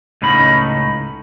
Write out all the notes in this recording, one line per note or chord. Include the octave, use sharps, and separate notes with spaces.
C#2 A2 C#4 D#4 B5